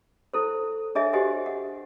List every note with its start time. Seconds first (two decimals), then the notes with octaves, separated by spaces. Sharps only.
0.34 E4 A4 C5
0.95 D4 G#4 C#5 D#5 E5 G#5
1.13 F#4 G4 C5 D#5 F#5 G#5
1.46 F#5